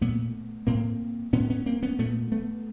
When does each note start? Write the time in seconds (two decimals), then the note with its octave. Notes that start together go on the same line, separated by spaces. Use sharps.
0.01 A#2 A3 B3
0.67 A2 A#3 C4
1.33 A2 B3 C#4
1.50 B3 C#4
1.66 A#3 C4
1.83 B3 C#4
1.99 A#2 A3 B3
2.32 A3 B3